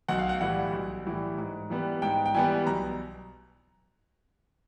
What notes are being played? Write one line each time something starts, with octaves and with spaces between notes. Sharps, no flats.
B1 F#5
F5
F#5
A2 E3 G3 F#5
B1
A2 E3 G3
G#2
E3 G3 B3
G#2 G5
G5
E3 G3 B3 G#5
B1 A#5